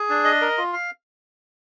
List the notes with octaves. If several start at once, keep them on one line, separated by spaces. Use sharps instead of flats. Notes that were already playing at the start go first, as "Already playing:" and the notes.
Already playing: G#4
D4
D#5
A#4
F4
F5